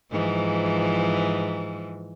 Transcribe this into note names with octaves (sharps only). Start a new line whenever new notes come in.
G#2 E3 F3